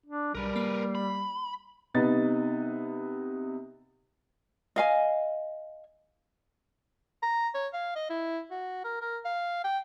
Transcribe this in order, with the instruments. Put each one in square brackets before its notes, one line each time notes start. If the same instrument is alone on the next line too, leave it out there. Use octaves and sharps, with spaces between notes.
[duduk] D4
[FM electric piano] B1 [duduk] G3 [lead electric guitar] A#4 B4
[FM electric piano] A#3 C7
[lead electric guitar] B5
[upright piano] C3 B3 D#4 A6
[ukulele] D#5 F5 G#5
[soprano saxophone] A#5
C#5
F5
D#5
E4
F#4
A#4
A#4
F5
G5